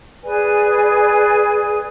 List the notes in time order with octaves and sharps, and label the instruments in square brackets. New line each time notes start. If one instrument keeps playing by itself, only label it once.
[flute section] G#4 B4 D5 G#5